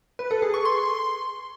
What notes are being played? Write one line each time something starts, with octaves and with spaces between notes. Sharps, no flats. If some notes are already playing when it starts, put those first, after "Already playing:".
B4
A4
G#4
C#6
C6